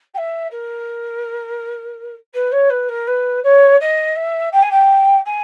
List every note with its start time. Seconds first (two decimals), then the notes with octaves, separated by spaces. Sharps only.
0.14 G5
0.17 E5
0.51 A#4
2.34 B4
2.52 C#5
2.70 B4
2.88 A#4
3.07 B4
3.43 C#5
3.80 D#5
4.15 E5
4.52 G5
4.62 G#5
4.71 G5
5.25 G#5